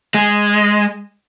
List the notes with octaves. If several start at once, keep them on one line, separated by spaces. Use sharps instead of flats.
G#3